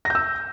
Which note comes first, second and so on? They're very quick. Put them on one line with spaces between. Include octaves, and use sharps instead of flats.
A#6 G6 E6